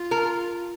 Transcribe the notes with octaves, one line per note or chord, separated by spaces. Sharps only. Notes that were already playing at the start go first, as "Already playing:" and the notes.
Already playing: F4
A#4